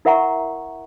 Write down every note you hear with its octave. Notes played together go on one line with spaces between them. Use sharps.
E4 A#4 E5 F#5 A#5 C#6